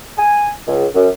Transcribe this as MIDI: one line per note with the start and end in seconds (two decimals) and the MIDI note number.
0.17 0.48 80
0.67 0.85 37
0.95 1.09 42